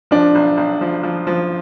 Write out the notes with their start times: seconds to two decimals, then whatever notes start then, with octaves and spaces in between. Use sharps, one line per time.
0.11 F3 D4
0.35 B1
0.57 B1
0.81 F3
1.03 F3
1.27 F3